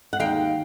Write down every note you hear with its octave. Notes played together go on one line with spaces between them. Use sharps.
F#5
D#2 F5 G5